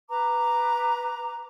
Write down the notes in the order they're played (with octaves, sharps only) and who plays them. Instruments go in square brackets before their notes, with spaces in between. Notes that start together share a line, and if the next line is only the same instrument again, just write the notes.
[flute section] B4 A#5 D6